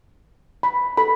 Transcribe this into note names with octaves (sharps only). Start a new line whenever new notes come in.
B5
A4 B5